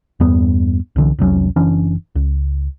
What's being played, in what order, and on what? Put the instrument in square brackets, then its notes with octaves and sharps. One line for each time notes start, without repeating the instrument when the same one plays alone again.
[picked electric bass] E2 G2 B3
C2 D3 E3
F1 C2 F#3 C#4
F#1 E3 C#4 D4
C#2